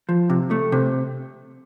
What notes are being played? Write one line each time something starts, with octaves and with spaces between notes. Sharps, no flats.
F3
C3
A3
C3